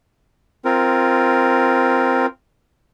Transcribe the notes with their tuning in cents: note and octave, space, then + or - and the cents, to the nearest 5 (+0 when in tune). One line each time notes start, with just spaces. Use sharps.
C4 +0 F4 -15 A#4 +0